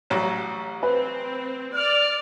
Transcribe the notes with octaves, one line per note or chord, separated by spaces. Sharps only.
A1 F#3 G3
C4 B4
D5 F6